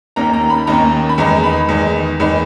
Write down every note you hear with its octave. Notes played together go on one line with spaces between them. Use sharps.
D#2 D#3 A#3 C#4 A#5
A#5
B5
D#2 D#3 A#3 C#4 A#5
B5
E2 D#3 G#3 D#4 A#5
B5
E2 D#3 G#3 D#4
E2 D#3 G#3 D#4 B5